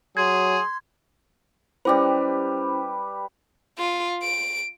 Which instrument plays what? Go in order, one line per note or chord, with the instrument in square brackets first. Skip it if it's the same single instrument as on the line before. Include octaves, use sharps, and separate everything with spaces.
[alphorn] F#3 [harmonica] G#4 [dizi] C6 [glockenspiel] G#6
[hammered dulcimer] G3 G4 B4 [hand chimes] C#4 E4 C5
[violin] F4
D7